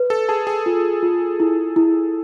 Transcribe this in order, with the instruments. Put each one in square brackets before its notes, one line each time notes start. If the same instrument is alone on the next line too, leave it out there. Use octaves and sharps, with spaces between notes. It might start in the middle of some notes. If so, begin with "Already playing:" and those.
Already playing: [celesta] B4
[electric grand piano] A4
[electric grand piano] G#4 [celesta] A5
[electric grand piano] G#4
[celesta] F4
F4
E4
E4